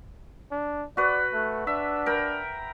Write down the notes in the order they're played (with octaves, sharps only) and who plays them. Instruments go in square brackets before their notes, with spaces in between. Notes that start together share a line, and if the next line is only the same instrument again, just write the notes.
[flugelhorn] D4
[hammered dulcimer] F#4 B4 [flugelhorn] D5
[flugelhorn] A3
[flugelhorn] D4 [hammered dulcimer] E5
[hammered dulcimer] A#4 G5 B5